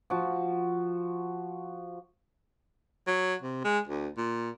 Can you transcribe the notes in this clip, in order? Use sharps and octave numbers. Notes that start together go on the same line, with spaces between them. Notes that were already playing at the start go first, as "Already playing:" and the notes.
F3 F#4
F#3
C3
G#3
D2
A#2